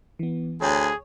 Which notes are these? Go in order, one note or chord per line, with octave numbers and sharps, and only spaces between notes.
E3 B3
D2 G#4 C#5